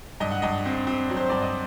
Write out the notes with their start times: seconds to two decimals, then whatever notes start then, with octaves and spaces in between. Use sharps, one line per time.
0.20 G2 D#5
0.31 F#5
0.42 G2 D#5
0.66 C4
0.87 C4
1.10 F#3
1.17 C5
1.30 G2 D5
1.42 D#5